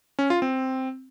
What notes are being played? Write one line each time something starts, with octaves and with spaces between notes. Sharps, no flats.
C#4
F4
C4